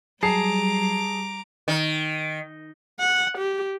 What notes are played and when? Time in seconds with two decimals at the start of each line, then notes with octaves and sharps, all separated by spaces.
0.23 F#3 G3 G#4 A5 A#5 D6 C7
1.68 D#3
3.00 F#5
3.38 G4